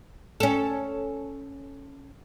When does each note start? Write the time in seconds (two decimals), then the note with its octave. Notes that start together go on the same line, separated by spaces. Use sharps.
0.40 C#4 A4